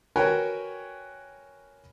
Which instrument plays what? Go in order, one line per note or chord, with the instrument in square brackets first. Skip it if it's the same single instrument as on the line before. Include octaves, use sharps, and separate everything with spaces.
[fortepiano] F#4 A#4 B4 C#5 G5 G#5